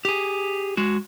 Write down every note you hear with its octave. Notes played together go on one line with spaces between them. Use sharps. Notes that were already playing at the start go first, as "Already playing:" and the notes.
G4 G#4
G#3 F#4